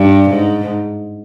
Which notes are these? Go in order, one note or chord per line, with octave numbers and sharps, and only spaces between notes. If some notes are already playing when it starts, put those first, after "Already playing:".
Already playing: G2
G#2